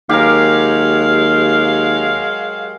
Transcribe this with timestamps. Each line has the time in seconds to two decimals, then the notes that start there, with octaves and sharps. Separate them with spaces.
0.09 D#2 F#3 G#3 G4 A#4 F5